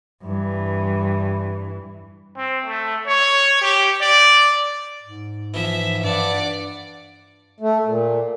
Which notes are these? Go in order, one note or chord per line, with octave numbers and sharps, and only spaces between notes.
G2 E3
C4
A3
C#5
G4
D5
G#2
E3 F3 E5
G2 D5 F#5
A3
A#2